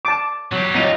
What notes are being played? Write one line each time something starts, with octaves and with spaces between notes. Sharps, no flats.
A5 D6
F#3 G4
D#4 F4